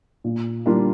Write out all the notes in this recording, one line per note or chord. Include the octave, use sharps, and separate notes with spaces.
A#2
G3 A#3 D4 F4